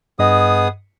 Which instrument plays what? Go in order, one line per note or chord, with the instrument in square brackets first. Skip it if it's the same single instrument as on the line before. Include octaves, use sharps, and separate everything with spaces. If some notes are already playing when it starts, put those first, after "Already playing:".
[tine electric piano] G2 D#5 [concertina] B3 G#4 D#6